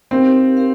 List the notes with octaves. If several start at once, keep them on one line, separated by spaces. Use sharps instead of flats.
C4 D#4 G4 A#4 F5
G4 A#4 F5